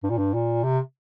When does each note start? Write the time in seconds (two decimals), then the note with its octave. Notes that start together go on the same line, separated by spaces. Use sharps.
0.03 G2
0.10 A#2
0.18 G2
0.34 A#2
0.63 C3